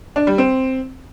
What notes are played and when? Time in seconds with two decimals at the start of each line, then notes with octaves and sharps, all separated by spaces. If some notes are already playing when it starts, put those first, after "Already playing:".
0.16 D4
0.27 G3
0.38 C4